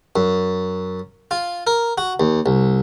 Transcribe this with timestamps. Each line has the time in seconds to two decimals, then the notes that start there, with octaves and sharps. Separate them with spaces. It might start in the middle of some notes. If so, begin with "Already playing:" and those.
0.16 F#2
1.31 F4
1.67 A#4
1.98 F#4
2.20 D#2
2.46 C2